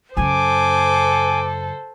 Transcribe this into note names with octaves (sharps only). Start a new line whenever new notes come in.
F#2 C#3 A4 C5 G#5 D6